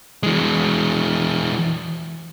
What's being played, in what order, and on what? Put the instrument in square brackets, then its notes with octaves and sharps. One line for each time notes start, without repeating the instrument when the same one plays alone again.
[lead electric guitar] E3 G#3